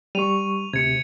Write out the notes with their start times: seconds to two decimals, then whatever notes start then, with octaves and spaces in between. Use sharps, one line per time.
0.15 G3 C#6 D#7 F7
0.73 D2 C3 G#6 C#7